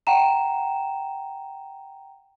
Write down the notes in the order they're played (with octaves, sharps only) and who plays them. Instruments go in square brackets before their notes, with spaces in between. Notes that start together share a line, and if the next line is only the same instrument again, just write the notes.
[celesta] F#5 G5 A#5 E7